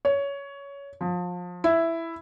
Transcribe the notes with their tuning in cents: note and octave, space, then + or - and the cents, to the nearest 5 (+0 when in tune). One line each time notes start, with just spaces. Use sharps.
C#5 +15
F3 +25
E4 +5